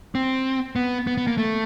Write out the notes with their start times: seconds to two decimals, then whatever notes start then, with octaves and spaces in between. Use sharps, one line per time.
0.15 C4
0.76 B3
1.07 B3
1.18 B3
1.27 A#3
1.38 A3